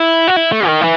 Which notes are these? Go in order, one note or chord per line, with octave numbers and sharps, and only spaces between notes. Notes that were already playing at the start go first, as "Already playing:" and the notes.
Already playing: E4
F#4
E4
A3
D#3
E3